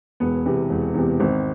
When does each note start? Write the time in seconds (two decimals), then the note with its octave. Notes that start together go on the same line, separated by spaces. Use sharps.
0.20 E1 B3
0.46 E2 C3
0.70 E1
0.94 E2 C3
1.20 G#1 C4